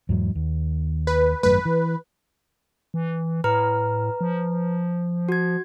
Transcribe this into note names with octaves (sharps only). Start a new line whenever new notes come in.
E2 G#2 F#3
D#2
B4
G#1 F#2 A3 B4
E3
E3
A2 B4 A#5 F6
F3
F#4 G#6